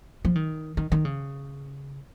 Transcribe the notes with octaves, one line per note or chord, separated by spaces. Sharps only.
F3
D#3
D#3
D#3
C#3